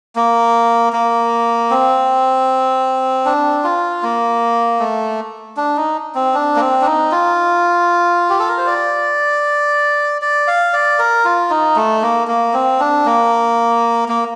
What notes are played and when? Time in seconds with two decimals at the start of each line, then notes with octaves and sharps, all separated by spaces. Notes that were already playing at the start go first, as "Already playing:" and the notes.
0.16 A#3
0.93 A#3
1.71 C4
3.26 D4
3.64 F4
4.03 A#3
4.80 A3
5.57 D4
5.77 D#4
6.15 C4
6.34 D4
6.56 A#3
6.60 C4
6.81 D4
6.86 D#4
7.12 F4
8.30 G4
8.39 A4
8.48 A#4
8.58 C5
8.67 D5
10.22 D5
10.48 F5
10.73 D5
10.99 A#4
11.25 F4
11.50 D#4
11.76 A3
12.02 A#3
12.28 A#3
12.54 C4
12.80 D4
13.06 A#3
14.08 A#3